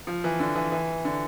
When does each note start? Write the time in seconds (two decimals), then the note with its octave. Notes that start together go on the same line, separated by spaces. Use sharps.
0.07 F3
0.24 E3
0.40 D3
0.56 E3
0.72 E3
1.05 D3